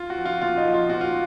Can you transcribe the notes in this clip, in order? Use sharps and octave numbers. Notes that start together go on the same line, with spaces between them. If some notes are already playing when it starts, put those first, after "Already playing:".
Already playing: F4
F#4
F3
F4
A#2 F4
D#4
F3
F4
A#2 F#4
F4